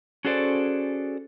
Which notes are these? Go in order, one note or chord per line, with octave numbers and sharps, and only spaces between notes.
C#4 F#4 G#4 A4 C5 D5